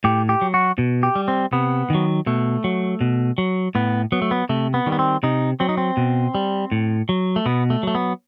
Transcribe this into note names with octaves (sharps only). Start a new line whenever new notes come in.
A2 G4
G4
F#3
F#4
B2
G4
G3
C4
C3 B3
D#3 F#3
B2 A3
F#3
B2
F#3
A2 B3
F#3 B3
A3
B3
C3 A3
B3
D#3 G3
B3
C4
C3 D#4
F#3 C4
D#4
C4
B2
G3
A2
F#3
A3
B2 B3
A3
F#3 A3
B3